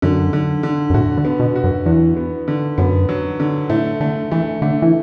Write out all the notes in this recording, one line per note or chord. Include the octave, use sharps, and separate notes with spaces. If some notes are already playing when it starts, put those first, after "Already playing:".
F#2 D3
D3
D3
F#2
A2 F#4
D3
B3
B2
F#4
F#2
E2 F#4
B3
D3
F#2 B3
F#3
D3
A2 A3
D3 A3
E3 A3
D3 A3
E3